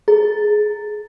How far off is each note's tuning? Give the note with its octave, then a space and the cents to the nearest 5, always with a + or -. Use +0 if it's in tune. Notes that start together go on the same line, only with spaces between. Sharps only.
G#4 +15